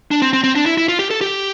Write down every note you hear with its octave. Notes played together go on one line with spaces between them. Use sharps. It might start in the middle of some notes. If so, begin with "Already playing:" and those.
D4
C4
C4
C4
D4
E4
E4
F4
G4
A4
G4